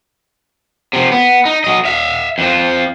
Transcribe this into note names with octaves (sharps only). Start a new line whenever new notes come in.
C3 F3
B3
D#4
F#3 D#5
E5 F5
F2 F3